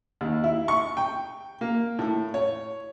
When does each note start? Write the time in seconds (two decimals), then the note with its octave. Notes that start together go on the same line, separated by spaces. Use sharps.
0.21 D#2
0.44 E4
0.68 C#6
0.97 G5
1.61 A#3
1.99 A2
2.34 C#5